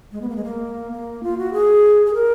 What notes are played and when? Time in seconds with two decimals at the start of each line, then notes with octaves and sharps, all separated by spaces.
0.12 G#3
0.22 B3
0.30 A#3
0.36 G#3
0.44 A#3
0.92 A#3
1.23 F4
1.38 F#4
1.53 G#4
2.06 G#4
2.14 A#4